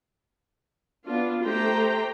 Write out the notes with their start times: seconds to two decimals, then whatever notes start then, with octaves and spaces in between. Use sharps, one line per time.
1.06 B3 D4 F4
1.42 A3 G4 C5 G5 A#5